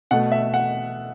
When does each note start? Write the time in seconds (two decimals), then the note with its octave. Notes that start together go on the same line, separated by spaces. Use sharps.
0.11 B2 A3 F#5
0.32 E5
0.54 F#5